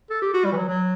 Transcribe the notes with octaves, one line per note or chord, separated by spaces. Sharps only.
A4
G4
F#4
G3
E3
F#3
F#3